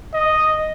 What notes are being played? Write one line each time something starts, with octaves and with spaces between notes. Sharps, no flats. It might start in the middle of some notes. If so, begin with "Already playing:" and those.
D#5